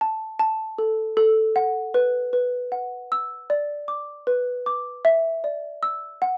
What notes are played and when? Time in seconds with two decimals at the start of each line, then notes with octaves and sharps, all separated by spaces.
0.01 A5
0.39 A5
0.78 A4
1.17 A4
1.56 F#5
1.94 B4
2.33 B4
2.72 F#5
3.12 E6
3.50 D5
3.88 D6
4.27 B4
4.66 D6
5.05 E5
5.44 D5
5.83 E6
6.22 F#5